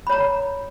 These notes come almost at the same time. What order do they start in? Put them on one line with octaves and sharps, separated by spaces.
B5 C#5 A#5